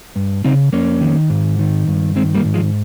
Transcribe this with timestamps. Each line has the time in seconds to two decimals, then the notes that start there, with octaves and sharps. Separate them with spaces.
0.16 G2
0.44 C#3 C4 D#4
0.72 F2 A#3 C#4
1.01 D#3
1.30 G#2
1.59 D#3
1.87 G2
2.15 D#3 G#3 C4
2.35 G3 A#3
2.45 G#2
2.54 F3 G#3